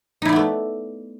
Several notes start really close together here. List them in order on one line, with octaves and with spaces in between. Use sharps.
D#4 E4 D5 B3 A3